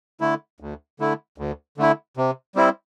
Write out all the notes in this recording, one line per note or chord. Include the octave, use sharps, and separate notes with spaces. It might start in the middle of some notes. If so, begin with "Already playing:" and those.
D3 A3 E4
D2
D3 A3 E4
D2
D3 A3 E4
C3
G3 C4 E4